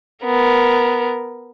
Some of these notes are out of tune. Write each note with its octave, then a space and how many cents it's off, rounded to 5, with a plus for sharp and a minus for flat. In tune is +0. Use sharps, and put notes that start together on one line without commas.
B3 +0 A#4 +5